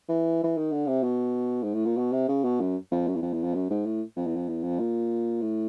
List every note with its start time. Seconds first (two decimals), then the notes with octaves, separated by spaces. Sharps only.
0.09 E3
0.44 E3
0.57 D#3
0.72 D3
0.87 C3
1.03 B2
1.63 G#2
1.74 A2
1.85 A#2
1.97 B2
2.12 C3
2.29 C#3
2.44 B2
2.60 F#2
2.91 F2
3.08 F#2
3.15 E2
3.22 F2
3.33 E2
3.44 F2
3.54 F#2
3.70 G#2
3.85 A2
4.17 F2
4.26 E2
4.36 F2
4.48 E2
4.63 F2
4.79 A#2
5.42 A2